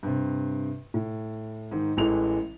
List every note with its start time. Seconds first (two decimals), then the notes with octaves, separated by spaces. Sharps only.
0.03 G2 C3
0.94 A2
1.71 G#2 D#3
1.97 A1 E3 G#3 A4 F7